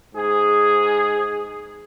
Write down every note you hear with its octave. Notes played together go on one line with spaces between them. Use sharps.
G#2 G#4